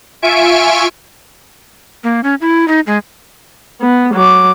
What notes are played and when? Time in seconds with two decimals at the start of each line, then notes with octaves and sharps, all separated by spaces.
0.22 F4 E5 G#5 C#6 D7
2.04 A#3
2.24 C#4
2.41 E4
2.68 D#4
2.87 G#3
3.81 B3
4.14 F#3 D6